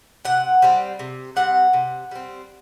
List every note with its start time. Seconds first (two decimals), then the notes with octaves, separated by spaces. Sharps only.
0.25 C3 F#5
0.62 G3 C4
0.99 C3
1.36 G3 C4 F#5
1.73 C3
2.11 G3 C4